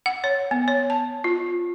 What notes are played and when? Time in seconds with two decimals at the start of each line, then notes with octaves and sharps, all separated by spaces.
0.06 F#5
0.24 C#5
0.51 B3
0.68 C#5
0.90 A5
1.24 F4